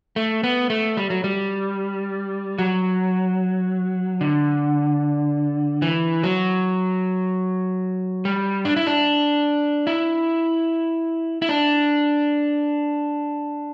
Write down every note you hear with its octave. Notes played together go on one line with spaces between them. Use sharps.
A3
B3
A3
G3
F#3
G3
F#3
D3
E3
F#3
G3
D4
E4
D4
E4
E4
D4